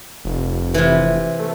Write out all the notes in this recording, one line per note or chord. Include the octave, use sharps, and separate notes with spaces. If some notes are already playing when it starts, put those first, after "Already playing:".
F1
C3 E3
A3